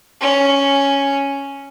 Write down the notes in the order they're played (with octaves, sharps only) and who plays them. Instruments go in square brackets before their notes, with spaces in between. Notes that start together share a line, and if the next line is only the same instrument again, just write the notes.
[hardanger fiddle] C#4